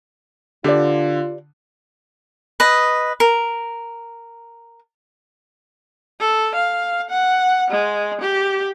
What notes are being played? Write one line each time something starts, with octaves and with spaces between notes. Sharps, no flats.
D3 F4 G4 B4 D5
B4 D#5
A#4
A4
F5
F#5
G#3
G4